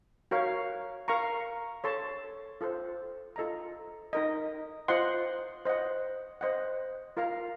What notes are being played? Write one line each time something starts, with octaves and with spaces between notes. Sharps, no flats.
F#4 A#4 C#5 F5
A#4 F5 A#5 C#6
A4 C#5 A5 C6
F4 A4 C5
F4 A4 D#5 A#5
D#4 A#4 D#5
F4 C5 D#5 F#5 C6
C5 D#5 F#5
C5 D#5 F#5
F4 A#4 F5 A#5